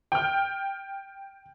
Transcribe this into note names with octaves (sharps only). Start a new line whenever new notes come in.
G5 F6